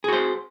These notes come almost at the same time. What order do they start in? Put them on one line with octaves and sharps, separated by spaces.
G#4 F#4 C5